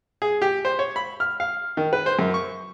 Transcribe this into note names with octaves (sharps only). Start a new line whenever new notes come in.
G#4
G4
C5
C#5
B5
F6
F5
D#3
B4
C5
F#2
C#6